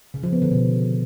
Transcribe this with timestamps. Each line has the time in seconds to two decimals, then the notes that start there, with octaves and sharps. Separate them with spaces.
0.14 C#3
0.23 F3
0.33 B3
0.42 D3
0.51 B2